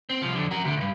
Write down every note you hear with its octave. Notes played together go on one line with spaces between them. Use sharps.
C4
C2 F3
F2 D3
F#4 A#4
D2 D3
C#2 G2